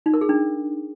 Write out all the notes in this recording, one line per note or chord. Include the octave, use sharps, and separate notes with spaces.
D#4
A#4
G#4
D4